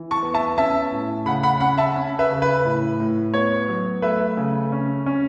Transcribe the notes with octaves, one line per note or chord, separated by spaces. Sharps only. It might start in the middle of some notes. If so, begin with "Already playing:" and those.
Already playing: E3
A5 C#6
B3
E5 A5
C#4 E5 A5
A2
C#3 F#5 B5
F#5 B5
C#4 F#5 B5
E5 A5
C#4
B4 E5
C#3
B4
A2
A2
B3 C#5
F#3
A3 B4 E5
C#3
C#4
C#4